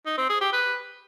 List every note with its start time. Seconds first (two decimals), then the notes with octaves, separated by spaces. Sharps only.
0.06 D#4
0.18 C4
0.29 G#4
0.41 G4
0.53 B4